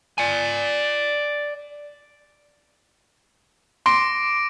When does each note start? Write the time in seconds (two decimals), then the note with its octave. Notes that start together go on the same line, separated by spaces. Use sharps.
0.18 D5 G#5
3.86 C6 D6 A#6 D7